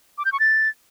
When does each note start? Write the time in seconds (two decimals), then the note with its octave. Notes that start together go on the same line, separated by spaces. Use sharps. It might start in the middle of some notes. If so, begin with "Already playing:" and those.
0.18 D6
0.25 G6
0.32 C#6
0.40 A6